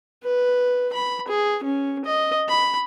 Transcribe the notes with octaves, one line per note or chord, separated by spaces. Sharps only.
B4
B5
G#4
C#4
D#5
B5